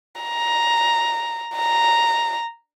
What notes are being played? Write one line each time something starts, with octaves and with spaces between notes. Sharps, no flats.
A#5
A#5